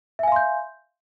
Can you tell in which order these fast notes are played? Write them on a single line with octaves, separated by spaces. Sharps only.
E5 G#5 F5 C6 G6